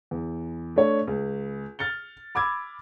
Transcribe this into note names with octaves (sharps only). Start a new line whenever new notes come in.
E2
A3 D4 C#5
C#2
F6 A6 C#7 G7
B5 D6 E6 G#6